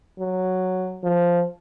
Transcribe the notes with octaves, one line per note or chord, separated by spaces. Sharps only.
F#3
F3